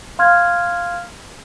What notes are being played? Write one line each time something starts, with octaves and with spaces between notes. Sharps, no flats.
F5 C6 F6 G#6